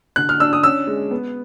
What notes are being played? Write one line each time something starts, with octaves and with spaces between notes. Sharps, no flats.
D3 F#6
F6
D4 E6
D#6
C#4 E6
G#3
B3